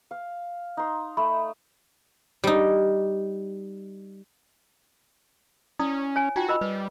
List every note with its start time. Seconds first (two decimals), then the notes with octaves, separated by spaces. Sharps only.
0.11 F5
0.77 D#4 C6
1.17 A3 B5
2.44 G3 D#4
5.79 C#4 E4 D5 D#6
6.16 C#5 G#5
6.36 D#4 F4 F#4 G5
6.48 A#4 D#5 B5
6.61 G3 B4